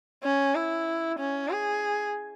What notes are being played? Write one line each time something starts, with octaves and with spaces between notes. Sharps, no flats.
C#4
E4
C#4
G#4